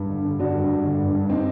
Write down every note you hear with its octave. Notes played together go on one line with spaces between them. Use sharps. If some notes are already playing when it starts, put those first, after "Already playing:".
Already playing: G2
D3
D3
D3 D4 F#4
G2
G2
D3
G2
G2
C4 D#4